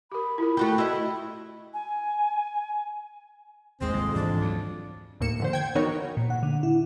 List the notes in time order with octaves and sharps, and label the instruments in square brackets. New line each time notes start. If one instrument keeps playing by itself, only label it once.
[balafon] G4 A#4 [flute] B5
[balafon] E4 F4 A#4
[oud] A3 F#4 G4
[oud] E4 D#5 [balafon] F#4
[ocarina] G#5
[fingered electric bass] G#1 D#2 [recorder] G#3 [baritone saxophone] C4
[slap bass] C2 [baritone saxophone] F2
[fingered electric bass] G#2 E3 [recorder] D4
[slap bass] D2 F#3
[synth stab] D#2 A2 A#3 C#7 E7
F2 D3 C5
G5 G#6
E3 B3 D#4 F#4 A#4 C#5
[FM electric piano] A#2
F#5
D3
E4